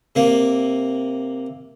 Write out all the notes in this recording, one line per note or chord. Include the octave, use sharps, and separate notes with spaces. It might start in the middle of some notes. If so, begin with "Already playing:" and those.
C3 A#3